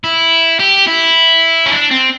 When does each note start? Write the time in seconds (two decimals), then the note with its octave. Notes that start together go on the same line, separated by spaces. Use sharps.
0.04 E4
0.60 G4
0.87 E4
1.66 C#4
1.72 D4
1.91 C4